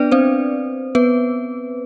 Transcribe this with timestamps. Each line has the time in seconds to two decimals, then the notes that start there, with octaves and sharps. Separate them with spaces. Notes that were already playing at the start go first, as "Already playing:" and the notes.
Already playing: B3 D4 B4 D5
0.12 C4 C5
0.95 B3 B4